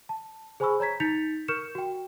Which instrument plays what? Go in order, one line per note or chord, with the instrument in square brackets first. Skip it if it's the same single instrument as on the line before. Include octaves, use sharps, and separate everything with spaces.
[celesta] A5
G#4 C5 G#5 B5 C#6 E6
C#5 A#5 G#6 B6
D#4 G6 A6 B6 C#7 F7
A#4 C#6 F6 G6 C#7 E7
F#4 G5